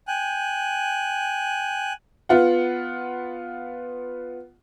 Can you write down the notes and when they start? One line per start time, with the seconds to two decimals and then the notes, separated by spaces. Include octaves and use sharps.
0.08 G5 G#5 F#6
2.29 B3 F4 F#5